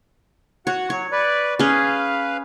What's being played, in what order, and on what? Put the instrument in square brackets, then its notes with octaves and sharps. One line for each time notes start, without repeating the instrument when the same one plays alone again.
[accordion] F#4 F#5 [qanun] C#5
[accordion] F#3 [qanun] C#5
[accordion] B4 D5
[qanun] C#4 G#4 [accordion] B4 F5